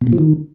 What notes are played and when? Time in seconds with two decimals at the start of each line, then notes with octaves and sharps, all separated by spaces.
0.01 B2
0.07 A#2
0.13 F3
0.18 D#3